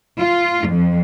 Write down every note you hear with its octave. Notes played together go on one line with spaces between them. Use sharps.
F4
F2